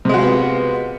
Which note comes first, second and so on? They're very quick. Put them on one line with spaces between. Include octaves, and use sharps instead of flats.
C3 G#3 F#4 F4 B3